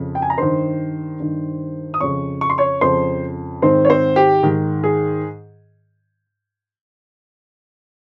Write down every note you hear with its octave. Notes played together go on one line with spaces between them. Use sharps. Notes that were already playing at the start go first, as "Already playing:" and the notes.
Already playing: F2 C#3
G5
G#5
A#5
G2 D#3 C5 C6
G2 D#3
D#6
F2 C#3 C#5 C#6
C#6
C6
C#5 C#6
F2 C#3 C5 C6
G#2 D#3 C4 C5
C#5
C4 C5
G4
G#2 D#3
G#4